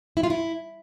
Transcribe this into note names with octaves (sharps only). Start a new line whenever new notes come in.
E4
F4
E4